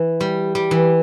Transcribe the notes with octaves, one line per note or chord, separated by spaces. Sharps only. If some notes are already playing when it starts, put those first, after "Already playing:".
Already playing: E3
G3
G3
E3